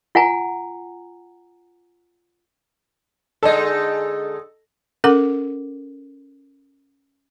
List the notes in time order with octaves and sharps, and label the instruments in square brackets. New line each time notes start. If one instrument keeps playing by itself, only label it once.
[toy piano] F4 F#5 G#5 A#5
[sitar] D3 G#3 D#4 [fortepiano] A4 D#5
[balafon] C#4 A4 A#4 F#5 D6